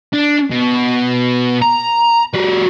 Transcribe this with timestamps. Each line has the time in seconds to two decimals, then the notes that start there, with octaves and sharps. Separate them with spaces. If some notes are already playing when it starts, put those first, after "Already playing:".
0.13 D4
0.50 B2
1.62 A#5
2.34 G3 F#4